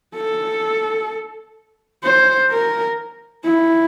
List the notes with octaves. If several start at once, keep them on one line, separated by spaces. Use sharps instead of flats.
A4
C5
A#4
E4